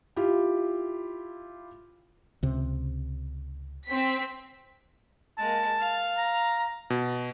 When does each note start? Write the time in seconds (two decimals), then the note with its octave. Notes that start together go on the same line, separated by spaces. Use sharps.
0.16 E4 F4 G4
2.43 C#2 C3
3.86 C4 B6
5.38 G#3 A#3 A5
5.80 F5
6.17 A#5
6.90 B2